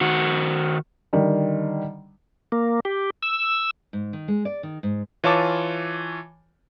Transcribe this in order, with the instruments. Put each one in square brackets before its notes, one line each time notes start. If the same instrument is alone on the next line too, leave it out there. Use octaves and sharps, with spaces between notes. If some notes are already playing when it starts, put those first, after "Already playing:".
[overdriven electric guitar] D#3 F#4
[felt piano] D3 D#3 G3
[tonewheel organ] A#3
G4
E6
[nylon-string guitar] G#2
D#3
G#3
D5
D#3
G#2
[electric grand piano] E3 F4 C#5 A5 D6